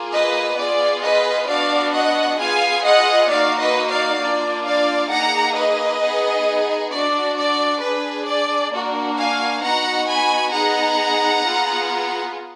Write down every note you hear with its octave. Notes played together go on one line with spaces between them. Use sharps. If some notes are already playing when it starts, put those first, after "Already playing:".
Already playing: A#3 F4 G#4
B4 D#5
B3 F4 G#4 D5
B4 D#5
B3 D4 F#4 D5 F5
D#5 F#5
B3 F4 G#4 F5 G#5
D#5 F#5
A#3 D#4 F#4 D5 F5
B4 D#5
D5 F5
A#3 D4 F4 D5
D5 F5
A#3 D#4 G#4 F#5 A#5
B4 D#5
B3 D#4 G#4
D4 F#4 D5
D5
D4 G#4 B4
D5
A#3 D4 F#4
F5 G#5
B3 D#4 F#4 F#5 A#5
G#5 B5
B3 D#4 G#4 F#5 A#5
B3 F4 G#4